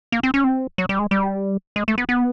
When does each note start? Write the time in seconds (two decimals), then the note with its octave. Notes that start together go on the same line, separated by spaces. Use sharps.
0.12 A#3
0.23 C4
0.34 C#4
0.44 C4
0.78 F#3
0.89 G3
0.99 G#3
1.11 G3
1.76 G#3
1.88 A3
1.98 B3
2.09 B3